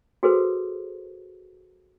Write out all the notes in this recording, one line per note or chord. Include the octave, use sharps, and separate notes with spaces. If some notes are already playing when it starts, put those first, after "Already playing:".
F#4 G#4 A4 B4 C5